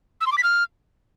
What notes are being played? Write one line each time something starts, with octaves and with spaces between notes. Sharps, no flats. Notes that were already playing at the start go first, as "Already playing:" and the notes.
E6
C6
D6
B6
F6